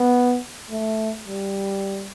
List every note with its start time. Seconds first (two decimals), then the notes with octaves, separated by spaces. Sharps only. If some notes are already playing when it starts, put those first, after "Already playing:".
Already playing: B3
0.71 A3
1.28 G3